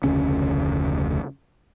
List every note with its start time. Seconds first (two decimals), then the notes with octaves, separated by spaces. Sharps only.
0.04 F1 D2 C#3 C#4